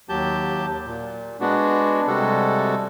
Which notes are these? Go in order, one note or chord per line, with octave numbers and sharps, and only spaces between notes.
D#2 F#3 G4 A5 G6
A#2
G#3 B3 D4 F#4
C3 G3 G#3 F#4 A4